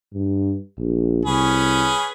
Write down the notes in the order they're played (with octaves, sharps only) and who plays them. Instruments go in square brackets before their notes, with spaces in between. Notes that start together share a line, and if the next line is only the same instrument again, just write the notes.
[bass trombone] G2
A#1
[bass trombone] C2 [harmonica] C#4 G#4 B4